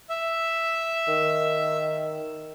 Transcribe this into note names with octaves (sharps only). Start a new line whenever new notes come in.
E5
D#3